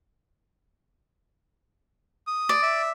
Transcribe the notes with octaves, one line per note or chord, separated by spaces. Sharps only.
D#6
D5
E5